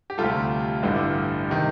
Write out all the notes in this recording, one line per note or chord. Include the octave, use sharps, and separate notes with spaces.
G4
D2 C3 G3 F4 A4
A1 G2 D3
C3 D#3